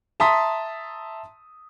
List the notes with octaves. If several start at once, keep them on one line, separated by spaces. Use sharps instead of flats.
E5 A5 A#5 C6 D#6 B6